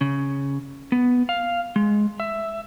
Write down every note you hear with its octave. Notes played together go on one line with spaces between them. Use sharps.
C#3
B3
F5
G#3
E5